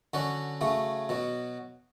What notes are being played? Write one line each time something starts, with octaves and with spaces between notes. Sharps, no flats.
D3 F#3 C#4 F#4
C#3 F#3 A3
B2 F#3